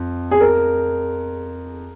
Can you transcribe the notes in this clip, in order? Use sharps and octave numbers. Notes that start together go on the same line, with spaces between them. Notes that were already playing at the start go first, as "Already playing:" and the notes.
Already playing: F2
G#4
A#4